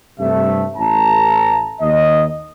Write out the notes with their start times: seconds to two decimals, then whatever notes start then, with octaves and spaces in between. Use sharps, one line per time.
0.20 G2 C3 A3 E5
0.77 A1 A5 A#5
1.81 D#2 D#5